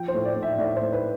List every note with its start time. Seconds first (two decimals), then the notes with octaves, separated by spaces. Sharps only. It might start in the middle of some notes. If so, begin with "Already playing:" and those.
Already playing: F3 G5
0.08 C5
0.14 A2
0.25 D5
0.36 A2
0.43 E5
0.59 A2 D5
0.76 C5
0.81 A2
0.93 B4